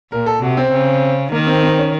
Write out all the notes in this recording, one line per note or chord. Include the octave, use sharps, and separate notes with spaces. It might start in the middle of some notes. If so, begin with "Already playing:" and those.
A#2 A#4
A4
C3 F#4
C4
C#3
D#3 A#3
C4
C4
C#4